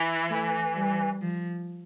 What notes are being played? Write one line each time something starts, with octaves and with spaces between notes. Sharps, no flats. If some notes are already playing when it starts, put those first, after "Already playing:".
Already playing: E3
A3
G3
F3